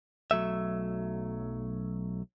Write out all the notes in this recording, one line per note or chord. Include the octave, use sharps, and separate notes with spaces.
B1 F#3 A3 E5